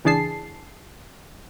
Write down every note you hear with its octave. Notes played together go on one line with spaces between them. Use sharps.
C#2 E3 D4 G#4 A5 C7